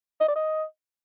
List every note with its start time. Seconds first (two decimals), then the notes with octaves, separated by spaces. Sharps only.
0.21 D#5
0.28 D5
0.36 D#5